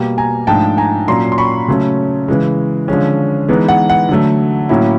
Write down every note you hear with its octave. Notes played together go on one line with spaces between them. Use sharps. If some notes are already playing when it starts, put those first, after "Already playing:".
Already playing: B2 G3 A#3
G#5 A#5
G#2 F3 A3 D4 F4 G5 A5
G#5 A#5
A#2 F#3 A#3 C#4 A#5 C6
C6
B5 C#6
C#3 F#3 A3 C#4
C#3 E3 G#3
D3 F3 G#3 C#4
E3 G#3 B3 D#4
F#5
F#5
D3 F#3 A3
A2 F#3 A#3 C#4 E4